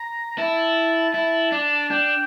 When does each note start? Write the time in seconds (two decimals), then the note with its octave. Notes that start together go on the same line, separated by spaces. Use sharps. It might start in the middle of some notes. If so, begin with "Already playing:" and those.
Already playing: A#5
0.38 E4 A5
1.14 E4
1.52 D4
1.91 D4 G5